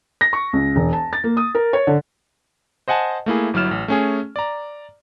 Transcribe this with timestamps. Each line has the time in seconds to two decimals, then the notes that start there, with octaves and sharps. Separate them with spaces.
0.21 A#6
0.33 C#6
0.53 C#2
0.76 E1
0.93 A5
1.13 A6
1.24 A#3
1.37 D#6
1.55 A#4
1.73 C#5
1.87 D3
2.88 C5 D#5 F#5 G#5 A5
3.26 A3 A#3 E4 G#4
3.54 G1 F#3 E4 F6 E7
3.71 A1
3.88 A3 C#4 G#4
4.36 D5 A#5